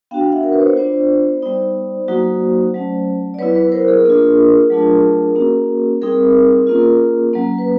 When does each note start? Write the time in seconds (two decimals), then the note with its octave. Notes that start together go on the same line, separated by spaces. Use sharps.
0.11 B3 D4 F#4 F5 G5
0.23 F5
0.32 E5 F#5
0.43 A#4
0.52 B4
0.60 C5
0.68 C#5
0.76 B3 D4 F4 C5 D5
1.42 G3 B3 D#4
2.08 F#3 A#3 D#4 F#4
2.74 F#3 A3 C#4
3.34 D5
3.39 F#3 B3 E4 B4 C#5
3.55 B4 C#5
3.72 A#4 C5
3.88 G#4 A#4
4.05 A#3 D4 F4 G#4 A#4
4.70 F#3 A3 D4 F4
5.36 A#3 C#4 F#4
6.02 G3 C4 D#4 G#4 A#4
6.67 A#3 C#4 F4
7.33 F#3 A#3 C#4
7.59 B4